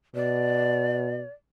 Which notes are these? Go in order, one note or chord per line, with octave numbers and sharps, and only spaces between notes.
B2 D5